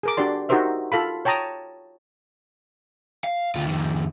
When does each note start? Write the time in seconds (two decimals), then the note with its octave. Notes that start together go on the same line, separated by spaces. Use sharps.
0.03 G#4 A#4 D6
0.17 D4 F#4 G4 D5 C6
0.49 D#4 F#4 G4 A#4 C5 E5
0.92 F4 A4 F5 B5
1.25 C#5 G5 A5 A#5 D#6
3.24 F5
3.55 D2 F4
3.68 F2 D#3